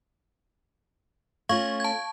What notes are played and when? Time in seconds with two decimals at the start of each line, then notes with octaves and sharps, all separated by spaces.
1.49 A3 C#4 F4 F5 C#6 G#6
1.80 A5 G#6